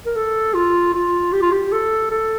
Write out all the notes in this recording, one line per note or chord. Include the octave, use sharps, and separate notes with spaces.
A#4
A4
F4
F4
G4
F4
G4
A4
A4